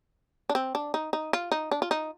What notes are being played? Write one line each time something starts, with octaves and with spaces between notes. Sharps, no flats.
D4
C4
D4
D#4
D#4
F4
D#4
D4
F4
D#4